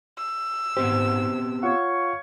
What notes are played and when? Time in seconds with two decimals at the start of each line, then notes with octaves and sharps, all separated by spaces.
0.18 E6
0.77 G#2 B3 C4 G4 C5
1.63 F4 C#5 F5 F#5 C#6